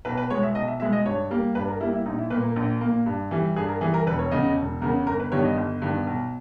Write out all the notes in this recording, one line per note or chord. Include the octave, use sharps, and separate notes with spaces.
B1 B4
B4
B2 G#3 B3 C#5
E5
B1 D#5
E5
B2 G#3 B3 E5
D#5
G2 C#5
G3 A#3
G2 B4
A#4
G3 A#3 E4
E4
A#1 D#4
E4
A#2 A#3 B4
A#4
A#1
A#2 A#3
G2
E3 G3
G2 G#4
A#4
E3 G3 G#4
A#4
E1 B4
C#5
E2 C#3 D#5
D#5
E1
E2 C#3 A#4
G1 A#4
B4
G2 D#3 G3 B3 C#5
D#5
G1
G2 D#3 G3 B3
B1